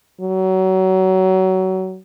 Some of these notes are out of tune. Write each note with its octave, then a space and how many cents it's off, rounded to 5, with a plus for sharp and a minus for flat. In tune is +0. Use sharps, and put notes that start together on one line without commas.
F#3 +25